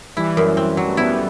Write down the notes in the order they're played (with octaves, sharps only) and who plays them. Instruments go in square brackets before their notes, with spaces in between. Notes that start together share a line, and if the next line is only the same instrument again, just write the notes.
[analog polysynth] E3 G3 [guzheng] E4
[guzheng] F#2
C4
F#3
[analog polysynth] A3
[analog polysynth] G3 B3 [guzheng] E4